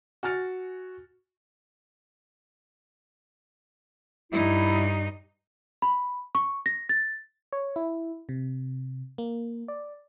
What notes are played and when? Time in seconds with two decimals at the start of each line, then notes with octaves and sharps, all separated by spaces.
0.23 F#4 G#5 F6 A6 C#7
4.32 G2 D#4 E4
5.82 B5
6.35 C#6
6.66 A#6
6.89 A6
7.53 C#5
7.76 E4
8.29 C3
9.18 A#3
9.68 D5